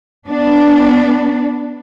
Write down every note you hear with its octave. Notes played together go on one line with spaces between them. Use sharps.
B3 D4